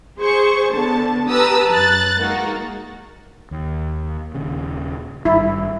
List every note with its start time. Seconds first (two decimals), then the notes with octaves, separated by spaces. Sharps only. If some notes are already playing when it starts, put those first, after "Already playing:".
0.19 G#4 C5 C#6
0.72 D3 B3 A5
1.28 G4 B4 A5 A#5 D#6 E6
1.71 F#2 F#6 A6
2.19 G#3 A#3 D#4 F#4 A#4
3.51 D#2
4.34 D#1 D#2 C#3
5.25 G#1 G2 E4